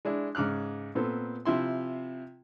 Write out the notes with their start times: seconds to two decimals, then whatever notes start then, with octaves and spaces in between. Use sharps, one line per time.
0.05 G#3 D4 E4
0.35 G#2 C#3 D6 F6 F#6
0.95 A#2 B3 C4 A4
1.45 C3 F3 E4 C6